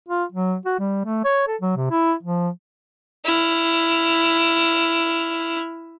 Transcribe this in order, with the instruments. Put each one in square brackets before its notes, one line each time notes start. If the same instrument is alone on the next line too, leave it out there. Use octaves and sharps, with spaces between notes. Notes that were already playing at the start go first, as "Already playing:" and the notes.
[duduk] F4
F#3
F#4
G3
A3
C#5
A4
F#3
C3
E4
F3
[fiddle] E4 F6